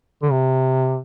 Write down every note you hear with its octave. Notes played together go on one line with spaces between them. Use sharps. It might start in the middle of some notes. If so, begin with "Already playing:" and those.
D3
C3